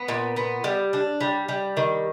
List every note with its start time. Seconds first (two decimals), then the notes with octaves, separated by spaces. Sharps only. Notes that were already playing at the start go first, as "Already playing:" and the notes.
Already playing: B3
0.08 A#2
0.36 B3
0.64 G3
0.93 D4
1.21 G3
1.48 G3
1.77 D#3